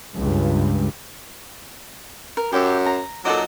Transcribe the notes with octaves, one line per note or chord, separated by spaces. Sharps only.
C#2 G2
A#4
F#2 G4 E5
A#5
A#2 F#3 D#4 A4 F#5 D6